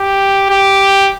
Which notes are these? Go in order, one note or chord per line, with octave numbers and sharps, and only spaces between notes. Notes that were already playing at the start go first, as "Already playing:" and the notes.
Already playing: G4
G4